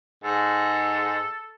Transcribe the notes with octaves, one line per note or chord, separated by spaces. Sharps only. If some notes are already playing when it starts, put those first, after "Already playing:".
G#2 A4